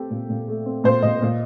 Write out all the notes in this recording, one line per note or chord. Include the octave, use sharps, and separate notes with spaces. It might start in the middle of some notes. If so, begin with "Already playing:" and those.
Already playing: A3 C4 G4 A4
A#2
A#2
A3
C4
A#2 C5
A#2 D#5
A#2